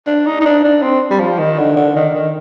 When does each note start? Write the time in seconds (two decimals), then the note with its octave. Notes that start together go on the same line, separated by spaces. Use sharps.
0.07 D4
0.26 D#4
0.41 D#4
0.46 D4
0.65 D4
0.82 C4
1.11 G3
1.20 F3
1.39 D#3
1.59 D3
1.76 D3
1.96 D#3
2.15 D#3